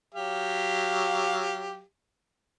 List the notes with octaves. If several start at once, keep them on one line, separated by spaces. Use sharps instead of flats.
F#3 G4 F5